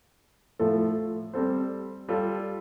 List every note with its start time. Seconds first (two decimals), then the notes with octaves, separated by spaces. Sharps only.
0.59 A2 F3 A3 F4 A4
1.33 G3 C4 A4 C5
2.08 G3 F4 A4